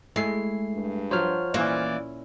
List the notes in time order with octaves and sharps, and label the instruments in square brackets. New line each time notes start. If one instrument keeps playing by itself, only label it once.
[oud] G#3 [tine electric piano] A3 C7 [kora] E4
[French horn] G2
[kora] F3 F#3 [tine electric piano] C5 C#5 F6
[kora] A#2 C#4 E4 [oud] E3 A#3 [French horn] D5